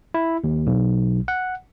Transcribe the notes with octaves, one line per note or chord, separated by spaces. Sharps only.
E4
D#2
B1
F#5